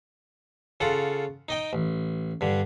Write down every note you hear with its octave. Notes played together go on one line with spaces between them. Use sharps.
C#3 F4 A4 F#5
D#4 D#5 G5
A1
G2 D3